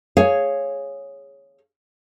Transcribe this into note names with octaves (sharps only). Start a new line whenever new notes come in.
G#4 C#5 F5